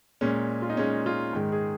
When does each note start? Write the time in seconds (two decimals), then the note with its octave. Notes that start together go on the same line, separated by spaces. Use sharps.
0.21 A#2 G#3 C#4
0.62 F4
0.70 D#4
0.77 A#2 G#3 C#4
1.06 F4
1.33 G#2 D#3 G#3
1.52 G#4